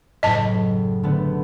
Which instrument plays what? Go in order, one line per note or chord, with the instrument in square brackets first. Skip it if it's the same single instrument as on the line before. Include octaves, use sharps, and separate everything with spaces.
[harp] F#1 A2 [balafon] D#5 A5
[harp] D3 A3 B3